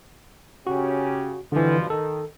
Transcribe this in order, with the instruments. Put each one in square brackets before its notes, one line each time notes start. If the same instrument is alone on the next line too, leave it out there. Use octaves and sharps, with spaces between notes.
[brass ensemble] C#3 C#4 G4 [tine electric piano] F#4
[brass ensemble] G2 B2 F3 [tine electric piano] D3 E3
[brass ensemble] D#3 [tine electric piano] A4